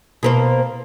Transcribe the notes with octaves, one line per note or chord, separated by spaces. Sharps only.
B2 A#3 C5